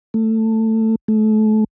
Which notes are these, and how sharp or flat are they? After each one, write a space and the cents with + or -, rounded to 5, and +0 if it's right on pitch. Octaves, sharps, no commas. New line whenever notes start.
A3 +15
A3 -30